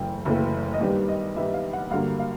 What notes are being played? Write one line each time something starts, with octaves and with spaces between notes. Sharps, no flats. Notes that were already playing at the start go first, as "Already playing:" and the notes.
Already playing: F#1 F#2 C#3 E3 A3 G5
F#1 F#2 C#3 E3 A3
D#5
G2 D#3 G3 B3 D5
D#5
G2 D#3 G3 B3 E5
F5
F#5
G2 D3 F#3 A#3 F5
F5